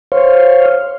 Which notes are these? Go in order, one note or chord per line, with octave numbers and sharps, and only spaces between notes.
C5 C#5 F5